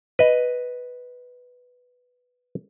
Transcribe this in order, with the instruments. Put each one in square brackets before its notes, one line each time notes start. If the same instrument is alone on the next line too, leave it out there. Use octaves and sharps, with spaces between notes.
[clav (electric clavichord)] B4 D#5